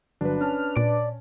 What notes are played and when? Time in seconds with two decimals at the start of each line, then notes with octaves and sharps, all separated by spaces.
0.21 G1 F#3 D4 B4
0.41 C#4 A5 F6
0.76 A#2 D5 D7